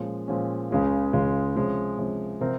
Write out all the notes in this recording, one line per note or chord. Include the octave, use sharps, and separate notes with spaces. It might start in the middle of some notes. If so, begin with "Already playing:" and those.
Already playing: A#2 F3 G#3 C#4
A#2 F3 G#3 C#4
C#2 C#3 G#3 C#4 F4
C#2 C#3 G#3 C#4 F4
C3 F3 G#3 C#4
C3 F3 G#3 C#4
C3 F3 C4 F4 A#4